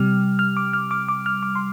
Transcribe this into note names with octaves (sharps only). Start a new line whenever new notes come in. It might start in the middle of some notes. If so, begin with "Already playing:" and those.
Already playing: C3 G3 F6
F6
D6
F6
D6
D6
F6
D6
C6